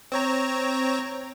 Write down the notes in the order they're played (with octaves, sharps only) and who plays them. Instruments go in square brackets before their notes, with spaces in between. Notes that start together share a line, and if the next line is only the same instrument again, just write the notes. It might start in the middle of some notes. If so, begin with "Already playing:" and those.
[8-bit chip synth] C4 C#5 A#5